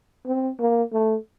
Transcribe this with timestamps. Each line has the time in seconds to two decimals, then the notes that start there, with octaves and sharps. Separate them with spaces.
0.26 C4
0.59 A#3
0.93 A3